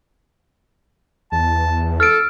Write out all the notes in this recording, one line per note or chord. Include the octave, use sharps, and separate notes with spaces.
E2 A5
A4 F6 D7